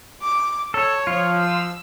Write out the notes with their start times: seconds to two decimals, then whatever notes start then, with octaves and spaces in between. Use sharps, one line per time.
0.22 D6
0.74 A4 C#5
1.07 F3 F4
1.39 E6